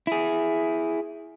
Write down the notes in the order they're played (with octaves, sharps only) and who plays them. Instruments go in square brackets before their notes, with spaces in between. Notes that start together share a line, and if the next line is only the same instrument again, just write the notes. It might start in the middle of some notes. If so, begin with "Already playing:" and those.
[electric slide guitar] E4 G#4